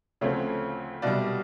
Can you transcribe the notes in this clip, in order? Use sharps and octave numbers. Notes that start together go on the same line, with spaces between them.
D2 C#3 F3 A3 C4 C#5
C2 B2 G3 D5